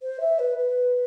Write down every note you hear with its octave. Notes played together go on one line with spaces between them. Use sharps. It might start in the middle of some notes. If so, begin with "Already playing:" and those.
C5
E5
B4
B4